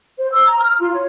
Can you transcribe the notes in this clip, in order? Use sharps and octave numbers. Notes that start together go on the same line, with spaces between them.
C5
E6
A#5
F6
F4
C#5